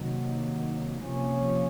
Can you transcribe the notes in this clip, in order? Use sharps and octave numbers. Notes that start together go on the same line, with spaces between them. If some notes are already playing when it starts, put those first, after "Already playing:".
Already playing: C3 D#3 F#3 A#3
C3 F3 A#3 C#4